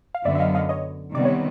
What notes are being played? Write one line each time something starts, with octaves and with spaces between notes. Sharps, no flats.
F5
F#2 D3 F#3 B3 D5 E5
E5
D#5 F5
D#5 F5
C#5 D#5
C3 D#3 G3 B3 D5
C#5